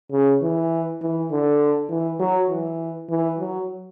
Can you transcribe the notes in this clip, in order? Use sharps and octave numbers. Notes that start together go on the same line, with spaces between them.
C#3
E3
E3
D3
E3
F#3
E3
E3
F#3